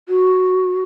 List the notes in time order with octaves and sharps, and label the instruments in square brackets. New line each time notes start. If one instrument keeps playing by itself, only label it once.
[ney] F#4